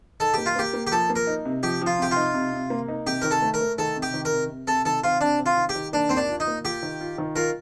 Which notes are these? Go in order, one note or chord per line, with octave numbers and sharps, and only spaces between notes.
D#4 A4
A#3 G4
F4
A#3 G4
A#3
G4
F3 A4
A#3
A#4
D#4
C3
F3 G4
F3
F4
C3 G4
D#4 F4
C3
C3
A#3
D#4
C3 G4
D#3 A#4
A4
A3
A#4
A3
D#3 A4
C3
G4
D#3
A#4
C3
C3
C3 A4
D#3 A4
C4 F4
C3 D4
C4
F4
D#3
G4
D#3
A#3 D4
D#2 C4
D4
F4
D#4
A#3
F4 G4
D#3
F4
D#3
F4 A#4